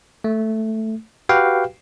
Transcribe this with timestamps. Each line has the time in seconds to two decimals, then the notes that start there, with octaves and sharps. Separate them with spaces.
0.24 A3
1.29 F#4 G4 B4 F5 G5